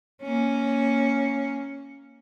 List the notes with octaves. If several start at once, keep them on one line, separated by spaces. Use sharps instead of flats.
A#3 C#4